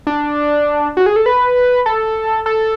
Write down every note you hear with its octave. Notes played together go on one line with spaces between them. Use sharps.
D4
F#4
G#4
A4
B4
A4
A4